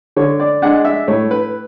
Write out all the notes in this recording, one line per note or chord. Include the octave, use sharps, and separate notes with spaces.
D3 C#5
D5
G#3 D4 F#5
E5
A2 C#5
B4